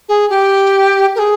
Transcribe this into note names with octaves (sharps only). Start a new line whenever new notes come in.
G#4
G4
A#4
G#4